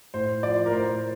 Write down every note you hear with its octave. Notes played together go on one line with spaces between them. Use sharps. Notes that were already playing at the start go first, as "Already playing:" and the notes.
A2 C5
F3 D5
A#4
A2 C5